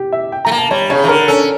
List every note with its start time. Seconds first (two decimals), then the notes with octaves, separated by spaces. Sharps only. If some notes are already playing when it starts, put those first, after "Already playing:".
Already playing: G4
0.12 E5
0.32 G5
0.45 A3 A#5
0.51 A#3
0.58 A5
0.71 G3 C#5
0.90 C#3 C#5
1.04 E3
1.08 D3 A#4
1.28 C#4 A4